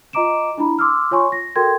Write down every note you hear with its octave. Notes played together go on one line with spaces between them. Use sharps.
F4 D#5 A#5 D6 D7 E7
D4 E4 A#5 B5
C6 D6 E6 F6
F4 C#5 G#5 C6 C#6
A#6
F#4 A4 A#4 G5 C6 G#6